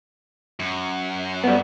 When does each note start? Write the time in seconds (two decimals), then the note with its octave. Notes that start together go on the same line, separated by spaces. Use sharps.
0.60 F#2
1.44 G3 B3